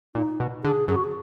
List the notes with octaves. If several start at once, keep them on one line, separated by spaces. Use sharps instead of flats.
A#2 D#4
B2
D3 G#4
F#2 G#4
F#4
G#4